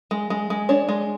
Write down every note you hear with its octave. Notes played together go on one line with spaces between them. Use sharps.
G#3
G#3
G#3
D4 C#5
G#3